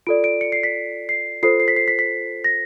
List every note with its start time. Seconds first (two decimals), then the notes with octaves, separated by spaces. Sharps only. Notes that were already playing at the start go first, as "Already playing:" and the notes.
0.07 F4 A4 D5 D7
0.24 D7
0.41 C#7
0.52 C7
0.63 B6
1.09 C7
1.43 F4 A4 C5 C7
1.60 C7
1.68 B6
1.76 C7
1.88 B6
1.99 B6
2.44 A#6